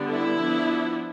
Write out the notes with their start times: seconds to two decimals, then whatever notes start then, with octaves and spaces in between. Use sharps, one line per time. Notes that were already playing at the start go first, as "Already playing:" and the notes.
Already playing: D3 G3 B3 D4
0.10 E4
0.39 F3 B3 D4